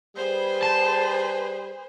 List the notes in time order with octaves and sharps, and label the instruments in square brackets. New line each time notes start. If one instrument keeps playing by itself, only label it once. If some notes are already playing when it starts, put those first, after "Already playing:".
[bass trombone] G3 [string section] G#4 B4 [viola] C5
[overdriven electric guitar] A5